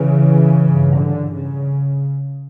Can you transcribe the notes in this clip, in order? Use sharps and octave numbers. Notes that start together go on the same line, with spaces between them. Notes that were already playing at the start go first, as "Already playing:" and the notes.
Already playing: C#3 E3
G2
D3
C#3